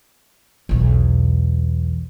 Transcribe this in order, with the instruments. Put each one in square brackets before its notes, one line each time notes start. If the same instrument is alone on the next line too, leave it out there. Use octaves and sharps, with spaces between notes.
[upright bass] B1 E2